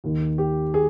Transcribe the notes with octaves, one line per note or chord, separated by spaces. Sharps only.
D#2 D#3
G4
G#4